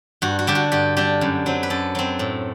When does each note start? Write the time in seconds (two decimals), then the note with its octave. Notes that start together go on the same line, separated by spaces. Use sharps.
0.22 G2 F#4
0.39 F#4
0.47 D3 G3 D4 G4
0.55 F#4
0.72 G2 G4
0.96 D3 G3 D4 G4
1.21 F#2
1.46 F#3 C4
1.63 B4
1.70 F#2 A4
1.95 F#3 C4
2.19 A2